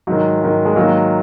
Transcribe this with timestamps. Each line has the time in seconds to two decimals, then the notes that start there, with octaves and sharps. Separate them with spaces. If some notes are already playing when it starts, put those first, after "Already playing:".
0.07 G#2 D#3 F#3
0.42 G#2 D#3
0.65 G#3
0.76 G#2 D#3 F#3 A#3